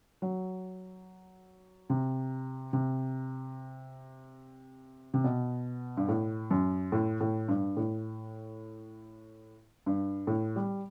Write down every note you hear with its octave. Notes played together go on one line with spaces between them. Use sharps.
F#3
C3
C3
C3
B2
G2
A2
F#2
A2
A2
G2
A2
G2
A2
G3